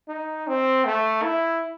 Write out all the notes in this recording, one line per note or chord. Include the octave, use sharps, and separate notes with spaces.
D#4
C4
A3
E4